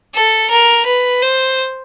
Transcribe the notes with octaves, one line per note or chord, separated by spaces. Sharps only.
A4
A#4
B4
C5